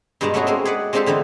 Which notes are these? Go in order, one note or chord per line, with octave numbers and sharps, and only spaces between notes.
G2 B2 G#3 D5 A5 A#5
A3 B3 C#4 E4 F#4 G#4
G#3 A#3 C4
G#4 B4 D5 F#5
G#3 C4 D4 F4 G4 A4
D3 E3 B3 D#4